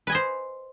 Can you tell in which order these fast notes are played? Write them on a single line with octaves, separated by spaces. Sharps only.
B4 G#5 D#5 C5